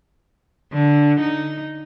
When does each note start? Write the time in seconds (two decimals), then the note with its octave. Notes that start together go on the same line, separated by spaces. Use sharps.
0.73 D3
1.20 D#4